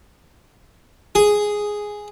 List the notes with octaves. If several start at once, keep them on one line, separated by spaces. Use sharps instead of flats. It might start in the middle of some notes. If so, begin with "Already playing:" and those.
G#4